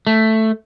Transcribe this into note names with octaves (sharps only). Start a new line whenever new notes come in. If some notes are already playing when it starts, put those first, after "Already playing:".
A3